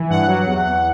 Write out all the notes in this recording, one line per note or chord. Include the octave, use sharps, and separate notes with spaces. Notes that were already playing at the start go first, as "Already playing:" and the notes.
Already playing: E3
G2 F#5
F#3
E2
E2